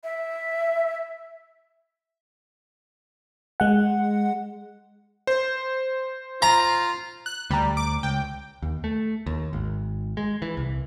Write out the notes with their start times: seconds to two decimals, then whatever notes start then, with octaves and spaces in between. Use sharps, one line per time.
0.04 E5
3.60 G#3 F#5
5.27 C5
6.42 F4 A#5
7.26 F#6
7.51 D2 G3 A#5
7.77 D6
8.03 C#2 G5
8.62 D#2
8.84 A3
9.26 D#2
9.53 G#1
10.17 G#3
10.42 E3
10.57 C2